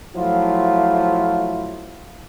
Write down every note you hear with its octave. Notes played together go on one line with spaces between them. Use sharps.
F3 F#3 A3 E4 F4